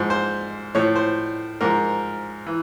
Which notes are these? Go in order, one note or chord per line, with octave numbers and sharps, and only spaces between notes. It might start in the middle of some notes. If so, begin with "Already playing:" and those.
Already playing: G#2 F3
C5
A2 F3 C#5
C5
G#2 F3 A#4
E3